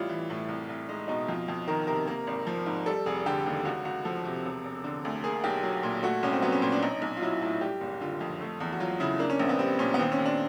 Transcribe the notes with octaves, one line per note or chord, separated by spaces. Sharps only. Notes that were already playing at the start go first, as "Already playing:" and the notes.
Already playing: A1 G3 E4 F4
E3
A2
C2
C2
G#3 D#4
B2 D#4
F2 F4
F2
D#3 A#4
C3 A#4
A#3
G#1
F3
G#2
G3 A4
F1 G#4
D3 G4
D#2
C#2 F#4
C#2 F#4
F3 A4
C3
E1
E1
D3
D2
A#3 G#4
B1 G4
F#3
A#2
A3 F#4
C2 C#4
C4
F#3 B3
C#4
A#2 C4
D4
B1 D#4
B1
F4
F#3 E4
A2 F4
G3 G4
F#1
D3 F4
F2
A3
E2
F#4
F#3 F4
C#3 E4
A#3 D4
C#4
A#1 C4
B3
G3 C4
A#2 C#4
B3
D#2 C4
C#4
D#2
D4